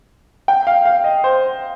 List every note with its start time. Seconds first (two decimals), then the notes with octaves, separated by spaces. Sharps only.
0.48 G5
0.67 F5
0.85 F5
1.04 D#5
1.24 C5